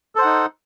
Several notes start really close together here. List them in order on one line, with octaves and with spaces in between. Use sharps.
A4 C5 F#5 D#4